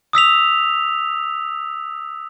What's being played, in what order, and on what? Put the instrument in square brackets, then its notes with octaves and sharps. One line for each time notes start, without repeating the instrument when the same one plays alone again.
[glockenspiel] D#6 E6 B6 F7